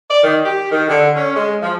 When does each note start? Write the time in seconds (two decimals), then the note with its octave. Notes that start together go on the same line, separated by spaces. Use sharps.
0.10 D5
0.23 D#3
0.44 G4
0.71 D#3
0.88 D3
1.16 C#4
1.36 G#3
1.62 F3